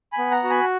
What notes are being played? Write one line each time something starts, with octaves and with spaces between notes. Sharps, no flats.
G#5 B5
B3
F#5 A#5
F#4
G#5 B5